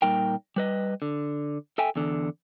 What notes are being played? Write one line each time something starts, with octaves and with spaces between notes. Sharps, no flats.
A#2 G3 D#4 A#4 G5
G3 B4 D#5
D3
A4 E5 G5 G#5
E2 D3